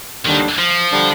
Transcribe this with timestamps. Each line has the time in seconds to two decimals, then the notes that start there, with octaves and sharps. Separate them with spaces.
0.25 D#2 D3 D#3 G3 D4
0.59 F3
0.92 D3 G3 D4